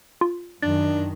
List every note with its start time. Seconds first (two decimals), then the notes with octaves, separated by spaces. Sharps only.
0.21 F4
0.62 F#2 D#3 D4 A6